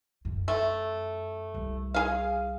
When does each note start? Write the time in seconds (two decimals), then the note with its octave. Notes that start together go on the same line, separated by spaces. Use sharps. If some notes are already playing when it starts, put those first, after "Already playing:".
0.25 F#2
0.48 A3
1.54 C2
1.94 G#4 F5